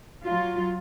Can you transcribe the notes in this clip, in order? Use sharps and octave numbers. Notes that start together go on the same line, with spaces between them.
F#3 F4